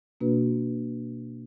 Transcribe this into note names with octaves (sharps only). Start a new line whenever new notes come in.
B2 A#3 D4 F#4 B4